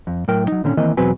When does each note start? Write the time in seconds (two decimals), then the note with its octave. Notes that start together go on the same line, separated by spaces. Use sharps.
0.07 F2
0.28 A2 F#3 A#4 G5
0.48 F#3 D#4
0.64 A#2 D3 D#3 C#4
0.77 D#3 E3 A#3 C4 A#4 D#5
0.97 E2 B2 F#3 C4 B4 G#5